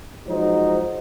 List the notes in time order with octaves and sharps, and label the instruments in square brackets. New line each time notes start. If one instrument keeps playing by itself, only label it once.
[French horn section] F3 F#3 G#3 D#4 F#4 C5